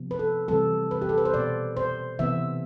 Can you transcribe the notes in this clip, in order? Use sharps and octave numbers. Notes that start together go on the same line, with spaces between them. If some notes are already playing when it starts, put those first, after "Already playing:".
Already playing: C3 F3 B3
B4
A4
C3 E3 G3 C4 A4
B4
G4
A4
B4
C5
B2 B3 D5
C5
C3 E3 B3 E5